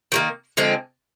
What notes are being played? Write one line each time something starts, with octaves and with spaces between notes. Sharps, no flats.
D#3 G3 A#3
D3 F3 G#3 C4